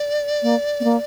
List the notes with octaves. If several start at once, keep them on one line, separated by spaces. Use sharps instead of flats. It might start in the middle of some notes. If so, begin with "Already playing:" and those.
Already playing: D5
A#3
B3
A#3